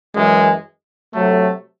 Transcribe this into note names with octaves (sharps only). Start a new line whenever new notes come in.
F#2 E3 G#3
C3 F#3 A3